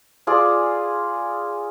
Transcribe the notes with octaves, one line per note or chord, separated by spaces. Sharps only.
F4 G#4 D5